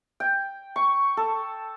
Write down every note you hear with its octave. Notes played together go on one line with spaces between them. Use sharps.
G5
C#6
A4